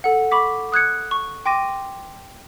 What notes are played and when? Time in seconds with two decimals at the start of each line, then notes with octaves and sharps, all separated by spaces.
0.04 A4 F#5
0.31 B5 C#6 D6 B6
0.72 D#6 F#6 G#6 C#7
1.11 C#6
1.46 G5 C6 D6 A#6 D#7